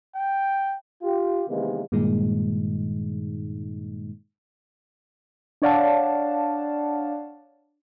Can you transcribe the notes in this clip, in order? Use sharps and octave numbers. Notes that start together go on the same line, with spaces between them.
G5
F4 G4
C3 D#3 E3 G#3 A#3 B3
G2 A#2 D#3 G#3 D#4
D4 C#5 D5 F5 F#5 A5